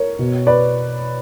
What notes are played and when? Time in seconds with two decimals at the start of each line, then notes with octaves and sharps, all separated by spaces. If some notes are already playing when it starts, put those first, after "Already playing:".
Already playing: A#4 C#5
0.19 B2
0.47 B4 D5